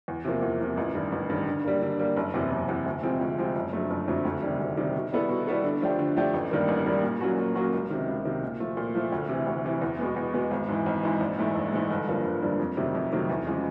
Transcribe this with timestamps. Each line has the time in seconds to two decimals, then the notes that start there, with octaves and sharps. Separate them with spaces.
0.08 E2
0.25 C3 F3 A#3
0.42 E2
0.60 C3 F3 A#3
0.77 A1
0.95 G2 D#3
1.12 A1
1.30 G2 D#3
1.47 D3
1.64 G3 A#3
1.82 D3
1.99 G3 A#3
2.17 F#1
2.34 E2 C3
2.51 F#1
2.68 E2 C3
2.86 D2
3.03 C3 F3 G#3 C4
3.21 D2
3.38 C3 F3 G#3 C4
3.55 F#1
3.73 F2 D3 F#3 A3
3.90 F#1
4.08 F2 D3 F#3 A3
4.25 D2
4.42 C3 D#3 G3
4.60 D2
4.77 C3 D#3 G3
4.95 B2
5.12 G3 B3 E4 A4
5.29 B2
5.47 G3 B3 E4 A4
5.64 D3
5.82 F3 A3 D4 G4
5.99 D3
6.16 F3 A3 D4 G4
6.34 A1
6.51 G2 D#3 G3 A#3
6.68 A1
6.86 G2 D#3 G3 A#3
7.03 A#2
7.21 F#3 A#3 C#4 F#4
7.38 A#2
7.55 F#3 A#3 C#4 F#4
7.73 C#2
7.90 C3 D#3
8.07 C#2
8.25 C3 D#3
8.43 A#2
8.60 F3 A3
8.77 A#2
8.95 F3 A3
9.12 D2
9.29 C3 E3
9.47 D2
9.64 C3 E3
9.82 E2
9.99 B2 G#3 B3
10.16 E2
10.34 B2 G#3 B3
10.51 G#1
10.68 G#2 E3
10.86 G#1
11.03 G#2 E3
11.20 A#1
11.38 G#2 E3 A3
11.56 A#1
11.73 G#2 E3 A3
11.90 G1
12.08 G2 D3 F3 A#3
12.25 G1
12.42 G2 D3 F3 A#3
12.59 F2
12.77 C3 D#3 F#3 A3
12.95 F2
13.12 C3 D#3 F#3 A3
13.29 E2
13.47 C#3 F3 G#3